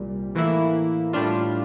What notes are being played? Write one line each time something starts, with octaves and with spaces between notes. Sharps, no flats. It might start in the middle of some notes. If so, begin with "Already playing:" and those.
Already playing: C2 A#2 G3
A2 E3 A#3 E4
A2 G3 D4 F4